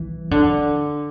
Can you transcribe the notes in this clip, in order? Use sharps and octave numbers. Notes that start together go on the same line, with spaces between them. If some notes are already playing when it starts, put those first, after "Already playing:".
Already playing: E3
D3